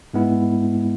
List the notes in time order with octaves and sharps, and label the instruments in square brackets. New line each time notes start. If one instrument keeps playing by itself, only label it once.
[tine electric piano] G#2 G#3 B3 E4